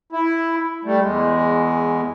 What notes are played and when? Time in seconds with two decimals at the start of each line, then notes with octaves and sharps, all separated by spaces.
0.12 E4
0.84 G3 A3
1.01 E2 G#3